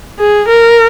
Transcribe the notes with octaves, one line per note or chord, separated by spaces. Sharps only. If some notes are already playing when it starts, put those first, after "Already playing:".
G#4
A#4